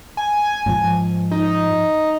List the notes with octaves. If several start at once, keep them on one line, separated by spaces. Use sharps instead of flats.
G#5
G#2 F3
D#4